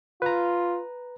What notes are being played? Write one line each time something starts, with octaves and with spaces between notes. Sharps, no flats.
F4 B4 A#5